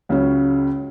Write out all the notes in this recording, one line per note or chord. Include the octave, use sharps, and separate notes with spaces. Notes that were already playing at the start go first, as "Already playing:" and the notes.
C#2 C#3 F#3 C#4